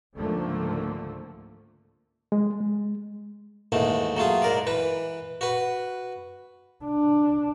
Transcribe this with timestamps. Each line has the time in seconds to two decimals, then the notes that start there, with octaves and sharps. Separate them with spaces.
0.15 C#2 G#2 D3 F3 A3 A#3
2.32 G#3
2.60 G#3
3.72 D#2 G#2 E3 A3
4.17 F#3 A3 F4 G#4
4.42 G#2 A#4 D5
4.67 E3 B4
5.41 F#4 B4
6.85 D4